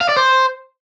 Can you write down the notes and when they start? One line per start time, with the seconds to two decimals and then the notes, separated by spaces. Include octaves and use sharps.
0.01 F5
0.09 D5
0.17 C5